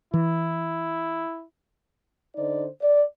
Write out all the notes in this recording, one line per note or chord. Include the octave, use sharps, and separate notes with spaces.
E3 E4
D3 D#4 C5 D5
D5